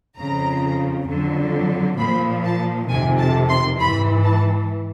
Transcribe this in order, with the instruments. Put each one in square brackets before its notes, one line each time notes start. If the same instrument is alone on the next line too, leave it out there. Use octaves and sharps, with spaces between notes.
[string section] F2 C#3 F3 A#5
F2 D3 F#3
A#2 F3 B5
A5
F2 C3 D#3 G#5
A5
C6
G#2 E3 B5
A5